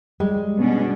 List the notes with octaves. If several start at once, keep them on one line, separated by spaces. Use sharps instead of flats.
G3 G#3
B2 C#4 D4